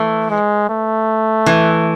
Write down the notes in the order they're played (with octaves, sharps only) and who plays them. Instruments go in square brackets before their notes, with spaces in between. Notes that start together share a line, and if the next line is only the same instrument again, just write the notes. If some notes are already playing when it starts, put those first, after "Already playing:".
Already playing: [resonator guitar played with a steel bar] E3 [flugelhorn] A3
[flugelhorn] G#3
A3
[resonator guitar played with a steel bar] E3